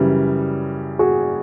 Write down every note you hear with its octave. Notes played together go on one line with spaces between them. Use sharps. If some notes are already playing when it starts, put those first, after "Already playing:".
Already playing: F#2 C#3 E3 G3
F#4 G#4